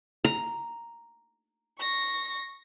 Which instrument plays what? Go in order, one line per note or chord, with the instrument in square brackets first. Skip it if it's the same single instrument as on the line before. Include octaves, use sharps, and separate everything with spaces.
[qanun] A#5
[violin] C#6 A#6